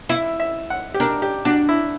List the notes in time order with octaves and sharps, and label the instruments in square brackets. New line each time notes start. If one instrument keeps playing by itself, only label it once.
[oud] E4 [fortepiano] E5
[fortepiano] E5
F#5
G4
[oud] D4 [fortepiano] A#4
[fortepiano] G4
[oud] D4 [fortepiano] F#4
[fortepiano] E4